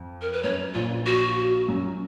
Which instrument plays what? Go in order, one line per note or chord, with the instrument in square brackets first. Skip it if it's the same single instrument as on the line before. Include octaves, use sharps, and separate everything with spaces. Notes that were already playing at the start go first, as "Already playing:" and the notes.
Already playing: [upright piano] F2
[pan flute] A#4
B4
[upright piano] F#2 [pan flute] C#5
[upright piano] A#1 A#2 [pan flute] F4
[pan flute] F#4
[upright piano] F#2